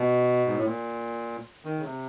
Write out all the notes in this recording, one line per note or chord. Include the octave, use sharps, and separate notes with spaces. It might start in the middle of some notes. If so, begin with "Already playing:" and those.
Already playing: B2
G#2
A2
A#2
D#3
C#3
C3